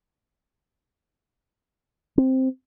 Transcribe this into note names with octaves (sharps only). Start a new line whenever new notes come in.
C4